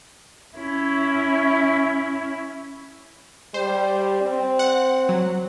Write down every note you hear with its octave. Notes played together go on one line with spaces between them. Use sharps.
C#4 E4
G3 C5
C4
F#5
F#3